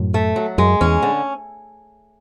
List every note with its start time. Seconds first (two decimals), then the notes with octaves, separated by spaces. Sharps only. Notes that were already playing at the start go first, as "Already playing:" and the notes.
Already playing: F#2 A2
0.14 A3
0.36 F#3
0.58 F#2 G#3
0.81 E2 C#4
1.02 D3